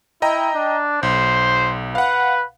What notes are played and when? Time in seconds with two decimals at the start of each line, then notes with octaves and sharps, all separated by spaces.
0.22 E4 D#5 G5 A#5
0.55 D4
1.03 B1 C5
1.95 B4 F5 F#5